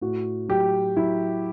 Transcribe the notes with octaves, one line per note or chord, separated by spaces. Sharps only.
A2 F#4
F#3 G4
F#3 E4